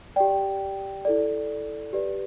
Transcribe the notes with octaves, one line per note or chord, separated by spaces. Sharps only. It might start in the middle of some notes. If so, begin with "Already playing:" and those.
G4 D5 G5
E4 A4 D5
G4 B4 D5